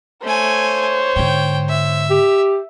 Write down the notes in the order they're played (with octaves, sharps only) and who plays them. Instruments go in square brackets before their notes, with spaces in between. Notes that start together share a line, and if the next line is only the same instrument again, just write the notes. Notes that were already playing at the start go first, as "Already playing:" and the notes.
[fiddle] A3 G#5 [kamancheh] C5 C#5
[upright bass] G#2 D3 [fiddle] G5
[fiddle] E5
[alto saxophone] G4